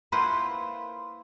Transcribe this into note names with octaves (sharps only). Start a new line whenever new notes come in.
A#3 E4 F4 B4 C5 F#5